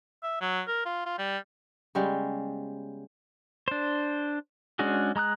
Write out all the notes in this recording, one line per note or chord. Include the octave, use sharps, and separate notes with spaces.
E5
F#3
A#4
F4
F4
G3
C#3 G3 G#3 B3
D4 C5
G#3 C#4 D4 F#4 G#4
G#3 A#5 D#6 F#6